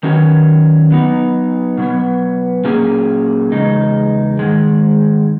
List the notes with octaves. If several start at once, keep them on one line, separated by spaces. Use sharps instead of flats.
D#3 F#3 C#4 F#4
F#3 B3 D#4
B2 F#3 B3
A#2 F#3 A#3 C#4 G#4
E2 C#3 G#3 D#4
G#2 D#3 G#3